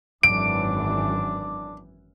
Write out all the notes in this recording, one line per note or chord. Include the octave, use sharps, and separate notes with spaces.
G#1 F#2 E3 D4 D6 D7